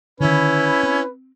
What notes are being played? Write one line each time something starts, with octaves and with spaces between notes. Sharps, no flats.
D3 D#3 C#4 E4 B4
C4